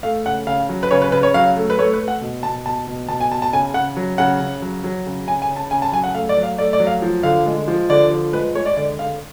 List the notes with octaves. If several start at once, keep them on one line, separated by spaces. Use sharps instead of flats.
A3 F5
C#3 F#5
C#3 F5
F#3
B4
C#3 C#5
B4
C#3 B4
C#5
F#3 F5
A3
B4
A3 C#5
B4
A3
F#5
B2
B2 A5
B2 A5
B2
B2 A5
G#5
B2 A5
A5
C#3 G#5
C#3 F#5
F#3
C#3 F#5
C#3
F#3
F#3
C#3
C#3 G#5
G#5
C#3
A5
C#3 G#5
A5
F#3 G#5
F#5
A3 F5
D5
F#3
F5
A3 D5
D5
F#3
F5
F3
D3 F5
G#3
F3
D3 D5
F3
G#3 B4
G#3 C#5
D5
D3 D5
D3 F5